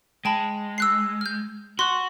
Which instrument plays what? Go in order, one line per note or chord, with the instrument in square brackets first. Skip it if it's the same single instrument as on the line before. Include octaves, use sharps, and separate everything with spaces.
[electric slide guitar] G#3 [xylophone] G5 A5 B5
[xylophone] E6 F#6 C7
F6 G6
[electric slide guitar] F#4 [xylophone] C6 C#6 F#6